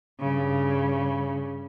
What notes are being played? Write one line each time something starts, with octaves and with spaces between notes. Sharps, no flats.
G2 C#3